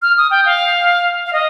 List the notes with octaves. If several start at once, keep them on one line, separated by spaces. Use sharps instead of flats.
F6
D#6
G5
F5
F5
D#5